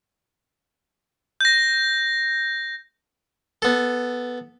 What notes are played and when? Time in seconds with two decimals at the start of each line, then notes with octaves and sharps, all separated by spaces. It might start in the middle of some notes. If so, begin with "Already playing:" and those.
1.41 G6 A#6
3.62 B3 A4